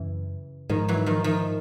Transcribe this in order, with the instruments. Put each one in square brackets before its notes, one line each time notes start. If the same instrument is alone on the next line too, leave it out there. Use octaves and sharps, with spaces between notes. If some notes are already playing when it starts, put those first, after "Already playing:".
Already playing: [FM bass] F#2 [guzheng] C#3 E3
[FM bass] G#2 [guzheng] D#3 F3
[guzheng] E3 F#3
D#3 F3
D#3 F3